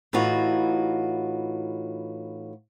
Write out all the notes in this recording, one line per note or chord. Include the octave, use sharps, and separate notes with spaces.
A2 E3 D#4 F4 F#4